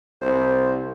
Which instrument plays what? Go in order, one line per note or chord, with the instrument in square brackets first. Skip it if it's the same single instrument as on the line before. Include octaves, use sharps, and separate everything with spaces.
[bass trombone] C2 [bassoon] C5